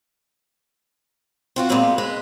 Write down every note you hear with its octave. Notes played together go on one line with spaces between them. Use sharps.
C4 F4 F#4
A#2 G#3 B3 C4 B4 F5
G#3 B4